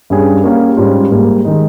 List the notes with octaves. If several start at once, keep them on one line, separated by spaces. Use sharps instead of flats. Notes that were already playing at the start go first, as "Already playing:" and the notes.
G2 G3 C#4 G#4
A#3 C#4 G4 C#5 F5
G#2 G3 C#4 F4
G#2 G3 A#3
D#3 G#3 D#4